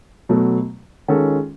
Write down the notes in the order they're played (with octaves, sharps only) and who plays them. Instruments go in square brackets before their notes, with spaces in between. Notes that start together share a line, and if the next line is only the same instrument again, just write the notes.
[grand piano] B2 F#3 A3
D#3 G#3 C#4 F4 A4